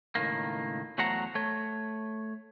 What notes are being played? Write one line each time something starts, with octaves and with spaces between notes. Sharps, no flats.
C#2 A2 D#3 A#3
E2 F#3 A3 C5 F#5 A#5
A3 C#5